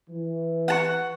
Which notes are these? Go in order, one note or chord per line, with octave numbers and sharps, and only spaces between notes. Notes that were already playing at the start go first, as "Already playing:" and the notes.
E3
F#5 A5 C#6